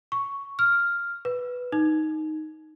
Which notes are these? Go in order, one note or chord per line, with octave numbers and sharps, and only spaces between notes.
C#6
F6
B4
D#4